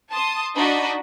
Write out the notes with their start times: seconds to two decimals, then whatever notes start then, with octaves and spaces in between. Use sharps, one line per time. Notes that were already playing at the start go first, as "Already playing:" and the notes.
0.11 A5 C6 D#6
0.56 D4 D#4 F#4 D5 D#5 B5